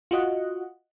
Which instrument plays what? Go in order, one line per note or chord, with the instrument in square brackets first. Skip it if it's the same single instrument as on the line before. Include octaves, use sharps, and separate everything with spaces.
[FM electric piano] F4 F#4 D#5 F#5